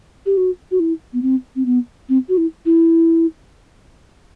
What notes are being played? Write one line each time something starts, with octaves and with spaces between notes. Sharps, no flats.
G4
F#4
F#4
E4
B3
C4
C4
B3
C4
F#4
E4
E4